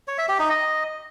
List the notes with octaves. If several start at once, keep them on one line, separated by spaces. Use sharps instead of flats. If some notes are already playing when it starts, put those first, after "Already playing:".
C#5
E5
G4
D#4
D#5